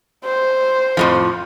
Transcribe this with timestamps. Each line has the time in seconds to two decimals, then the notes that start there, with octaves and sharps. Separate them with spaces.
0.25 C5
0.97 F2 A2 F3